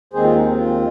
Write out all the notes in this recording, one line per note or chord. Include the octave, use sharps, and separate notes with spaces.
D#2 D#3 G#3 C4 G#4 C5
F4
D#4
F4